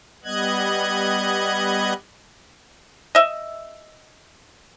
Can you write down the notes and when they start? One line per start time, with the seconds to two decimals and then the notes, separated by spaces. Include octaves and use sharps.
0.24 G3 B3 D#5 F#6 G#6
3.15 D#5 E5